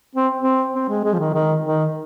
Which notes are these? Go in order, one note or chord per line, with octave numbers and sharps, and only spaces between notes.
C4
C4
C4
G#3
G#3
F3
D#3
D#3
D#3